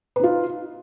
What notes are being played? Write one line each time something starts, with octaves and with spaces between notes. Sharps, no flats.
D#4 F4 B4